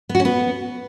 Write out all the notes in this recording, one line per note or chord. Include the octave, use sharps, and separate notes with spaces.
B3
F#4
C#4
B3